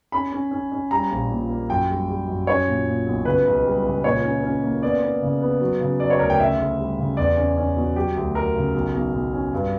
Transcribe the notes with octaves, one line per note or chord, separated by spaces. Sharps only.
C#4 B5
C#4
C#4
C#4
G3 A#5
A#1
A#2
A#3
F#2 G5
G3
G3
F#2
C#4 C#5
A#2
A#2
B1
C#3 B4
C#2
G3
C#2
A#2 C#5
C#4
C#4
A#3
B3 D5
B3
C#3
B3
F#3
C#3
F#3 D5
C#5
D2 A#4
G5
C#3 E5
D2
G3
C#3
E2 D5
C#4
C#4
B2
F#3 G4
D2
F#3 A#4
C#3
B1
B1
B1
C#4
G2